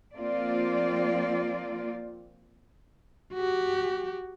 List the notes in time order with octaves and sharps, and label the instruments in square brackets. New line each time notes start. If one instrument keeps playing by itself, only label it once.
[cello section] F3 A#3 C4 F4 D5
[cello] F#4 G4